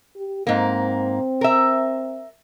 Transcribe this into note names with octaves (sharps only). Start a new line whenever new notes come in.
G4
G#2 A#3 C4
A#4 E5